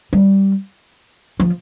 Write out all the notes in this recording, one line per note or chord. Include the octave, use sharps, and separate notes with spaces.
G3
F3